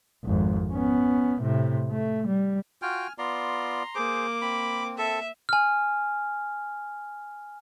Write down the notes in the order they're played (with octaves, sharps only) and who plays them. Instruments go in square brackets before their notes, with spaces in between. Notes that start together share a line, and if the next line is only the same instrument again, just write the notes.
[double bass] G#1 F2
B3 C#4
A2 C3
A3
G3
[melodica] F4 F#4 G5 [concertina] G#5 F6
[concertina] B3 F4 D5 [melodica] A#5 C6
[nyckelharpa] A#3 D6 [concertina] G#4 C5
[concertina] C4 [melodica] B5
[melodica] A4 [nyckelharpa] E5
[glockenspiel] G#5 F6